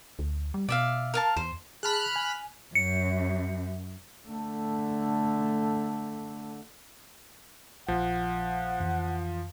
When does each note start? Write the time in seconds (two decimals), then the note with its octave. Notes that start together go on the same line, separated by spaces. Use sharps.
0.19 D2
0.54 G3
0.69 B2 D5 E5 F5
1.14 A#4 F5 A5
1.37 E2 C5
1.83 G#4 A5 B5 F6 F#6
2.16 G#5
2.75 F#2 C#7
4.28 D3 A3
7.88 A#1 F3 F#5
8.80 F2 E3